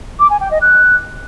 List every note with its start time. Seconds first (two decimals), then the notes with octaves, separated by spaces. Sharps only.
0.19 D6
0.30 G#5
0.40 G5
0.51 D#5
0.62 F#6